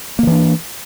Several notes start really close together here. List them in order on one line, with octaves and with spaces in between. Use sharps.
A#3 D#3 E3 D4